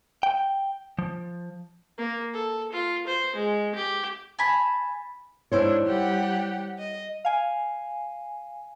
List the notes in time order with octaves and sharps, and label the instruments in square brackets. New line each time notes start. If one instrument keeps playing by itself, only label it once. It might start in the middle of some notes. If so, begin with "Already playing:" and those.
[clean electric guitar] G5
F3
[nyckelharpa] A#3
A4
F4
C5
G#3
G4
[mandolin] G#5 A5 B5
[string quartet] G#2 D4 [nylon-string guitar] E4 C5 C#5
[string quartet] G3 G4 F#5
D#5
[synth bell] F5 G#5